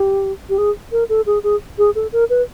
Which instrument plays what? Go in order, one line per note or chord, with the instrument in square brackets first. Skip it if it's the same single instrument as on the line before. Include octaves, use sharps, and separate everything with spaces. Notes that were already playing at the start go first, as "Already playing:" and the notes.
Already playing: [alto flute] G4
G4
G#4
A#4
A4
G#4
G#4
G#4
A4
A#4
B4